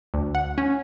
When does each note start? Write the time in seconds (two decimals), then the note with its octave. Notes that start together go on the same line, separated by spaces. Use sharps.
0.14 D2
0.35 F#5
0.58 C#4